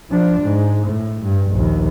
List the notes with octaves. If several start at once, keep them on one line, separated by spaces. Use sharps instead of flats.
F3 D4
G#2
A2
G2
A#1 D#2